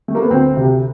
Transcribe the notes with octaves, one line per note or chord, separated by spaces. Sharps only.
A3
A#3
B3
D2 C4
C3